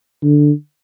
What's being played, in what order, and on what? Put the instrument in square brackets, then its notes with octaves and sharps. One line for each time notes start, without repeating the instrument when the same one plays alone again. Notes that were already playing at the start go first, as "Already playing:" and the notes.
[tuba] D3